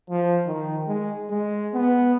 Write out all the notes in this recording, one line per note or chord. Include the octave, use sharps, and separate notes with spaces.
F3
D#3
G#3
G#3
B3